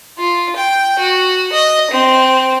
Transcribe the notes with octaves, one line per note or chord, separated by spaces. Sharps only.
F4
G5
F#4
D#5
C4